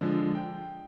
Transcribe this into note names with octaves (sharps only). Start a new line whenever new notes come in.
D3 F3 G#3
G5